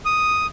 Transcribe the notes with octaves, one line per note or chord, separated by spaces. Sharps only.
D#6